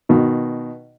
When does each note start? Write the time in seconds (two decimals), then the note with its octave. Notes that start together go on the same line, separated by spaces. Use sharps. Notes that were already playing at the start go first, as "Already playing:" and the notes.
0.09 B2 D#3